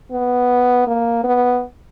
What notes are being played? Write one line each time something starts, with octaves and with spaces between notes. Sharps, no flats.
B3
A#3
B3